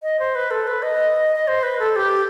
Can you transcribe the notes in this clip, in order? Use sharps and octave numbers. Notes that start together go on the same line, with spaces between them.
D#5
C5
B4
A4
B4
D#5
D#5
C5
B4
A4
G4